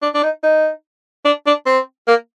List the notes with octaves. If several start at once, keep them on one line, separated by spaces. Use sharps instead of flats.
D4
D4
D#4
D#4
D4
D4
C4
A#3